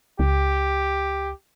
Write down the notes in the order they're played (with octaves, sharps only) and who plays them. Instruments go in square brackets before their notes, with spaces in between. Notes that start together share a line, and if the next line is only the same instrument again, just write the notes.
[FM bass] C#2 [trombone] G4